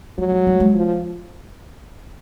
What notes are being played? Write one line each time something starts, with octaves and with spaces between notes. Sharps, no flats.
F#3 G3
G3
G3
G#3
F3